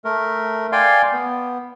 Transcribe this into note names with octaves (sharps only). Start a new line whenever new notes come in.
A3 A#4
D5 F5 G5 G#5 C6
B3